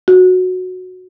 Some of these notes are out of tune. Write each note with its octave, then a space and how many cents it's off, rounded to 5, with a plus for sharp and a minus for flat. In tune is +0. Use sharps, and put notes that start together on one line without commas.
F#4 -10